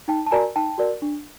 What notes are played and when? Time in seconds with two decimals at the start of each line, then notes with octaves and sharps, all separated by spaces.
0.08 D#4 G5 A5
0.26 A5
0.31 F#4 A#4 D5 G#5 A#5
0.56 D#4 G5 A5
0.78 F#4 A#4 D5
1.02 D4